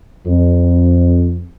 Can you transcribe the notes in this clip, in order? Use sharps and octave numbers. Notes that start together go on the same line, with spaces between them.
F2